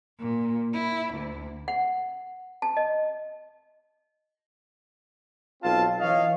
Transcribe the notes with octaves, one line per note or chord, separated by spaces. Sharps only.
A#2
E4
D2
F#5
A5
D#5
B1 C4 F4 F5 A5
E3 C#5 D#5 F5